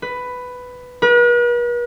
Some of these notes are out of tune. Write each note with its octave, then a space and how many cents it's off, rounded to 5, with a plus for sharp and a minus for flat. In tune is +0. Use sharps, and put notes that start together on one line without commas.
B4 +10
B4 -45